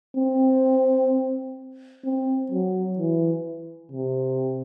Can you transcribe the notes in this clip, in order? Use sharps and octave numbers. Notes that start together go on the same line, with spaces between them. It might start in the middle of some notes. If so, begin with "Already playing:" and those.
C4
C4
F#3
E3
C3